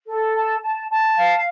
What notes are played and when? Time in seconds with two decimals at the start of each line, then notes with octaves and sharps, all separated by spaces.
0.07 A4
0.35 A5
0.62 A5
0.90 A5
1.17 F5